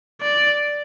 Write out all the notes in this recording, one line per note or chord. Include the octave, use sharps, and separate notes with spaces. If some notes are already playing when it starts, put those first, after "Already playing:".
D5